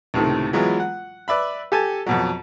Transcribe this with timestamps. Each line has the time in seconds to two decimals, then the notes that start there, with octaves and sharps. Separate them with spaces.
0.14 C#2 A2 C3 D#3 A3
0.53 E3 F#3 G#3 B3 F4
0.80 F#5
1.28 B4 D5 E5 B5
1.72 G4 A4 G#5 A5
2.06 F2 B2 F#3